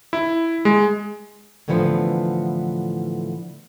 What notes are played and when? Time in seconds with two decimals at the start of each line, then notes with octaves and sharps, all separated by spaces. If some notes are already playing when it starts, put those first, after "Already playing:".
0.13 E4
0.65 G#3
1.68 A2 D3 E3 F3 B3